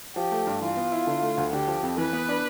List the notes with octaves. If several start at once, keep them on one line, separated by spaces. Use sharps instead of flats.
F3 G4
A3
G2
E3 F4
B3
E4
D3
A3
D2
D3 G4
F3
F2
E3 B4
B3
D4